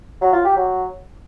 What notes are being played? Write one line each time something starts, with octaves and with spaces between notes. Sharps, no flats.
F#3
F4
G4
F#3